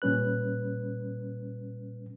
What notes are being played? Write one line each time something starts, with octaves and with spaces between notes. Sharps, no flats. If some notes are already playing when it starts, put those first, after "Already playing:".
A#2 G3 C#4 B4 F#6